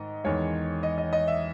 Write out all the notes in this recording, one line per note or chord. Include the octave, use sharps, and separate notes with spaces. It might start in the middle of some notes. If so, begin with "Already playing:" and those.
Already playing: G#2 D#3 D#5
E2 D#3 G#3 C#5
D#5
D#5
D#5
E5